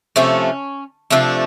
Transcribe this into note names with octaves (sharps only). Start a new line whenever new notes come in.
C3 F3 A3 C#4
C3 F3 A3 D4